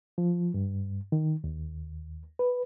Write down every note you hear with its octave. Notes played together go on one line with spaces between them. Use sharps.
F3
G2
D#3
D#2
B4